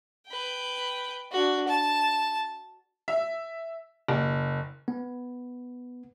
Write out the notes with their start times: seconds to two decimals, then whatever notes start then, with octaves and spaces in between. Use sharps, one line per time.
0.28 B4 G5
1.32 D4 F#4
1.68 A5
3.08 E5
4.08 F#1
4.88 B3